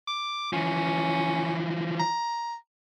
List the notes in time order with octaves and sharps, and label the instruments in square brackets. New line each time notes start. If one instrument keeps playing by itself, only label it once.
[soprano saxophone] D6
[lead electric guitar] E3 F3 [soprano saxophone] C#4
[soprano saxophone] A#5